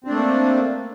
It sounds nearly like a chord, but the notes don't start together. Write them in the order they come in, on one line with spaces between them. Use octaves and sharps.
C4 D4 A3 A#3